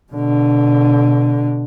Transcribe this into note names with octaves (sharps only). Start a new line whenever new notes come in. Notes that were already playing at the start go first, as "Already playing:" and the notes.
B2 D3